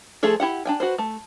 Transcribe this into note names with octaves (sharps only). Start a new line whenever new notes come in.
F3 A3 G#4 A4
E4 G4 F#5
D4 G5 G#5
F#4 B4 C5
A3